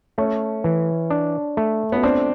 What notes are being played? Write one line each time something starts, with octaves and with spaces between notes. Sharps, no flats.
A3 C#4
E3
D4
A3
B3
C4 D4